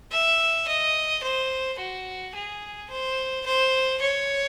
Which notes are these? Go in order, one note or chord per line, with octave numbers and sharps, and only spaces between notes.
E5
D#5
C5
F#4
G#4
C5
C5
C#5